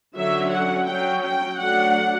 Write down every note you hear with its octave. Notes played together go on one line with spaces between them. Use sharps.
D3 F#3 C#4 E5
F#5
F#3 C#4 G5
G5
F#3 A3 D4 F#5